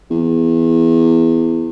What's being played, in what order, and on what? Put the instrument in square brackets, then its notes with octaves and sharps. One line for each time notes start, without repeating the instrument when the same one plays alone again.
[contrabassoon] E2